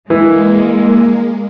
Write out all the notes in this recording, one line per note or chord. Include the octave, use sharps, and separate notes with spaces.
E3 G#3 A#3